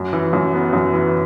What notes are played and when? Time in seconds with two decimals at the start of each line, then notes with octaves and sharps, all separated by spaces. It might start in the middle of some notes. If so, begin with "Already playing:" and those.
Already playing: F#2
0.13 E3
0.33 F#2
0.54 B3
0.73 F#2
0.94 E3